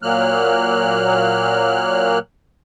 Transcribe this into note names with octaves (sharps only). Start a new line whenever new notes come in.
A#2 F#3 A#3 F6 F#6